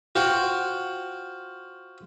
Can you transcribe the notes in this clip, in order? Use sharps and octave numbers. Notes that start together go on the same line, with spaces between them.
F4 F#4 C5 F#5 G5